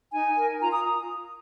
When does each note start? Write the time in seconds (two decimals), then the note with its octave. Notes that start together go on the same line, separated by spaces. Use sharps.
0.13 D#4 G#5
0.36 A#4
0.60 F4 A#5
0.72 D#6